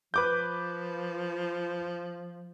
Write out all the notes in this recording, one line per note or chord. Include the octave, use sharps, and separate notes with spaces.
F3 B4 D6 G6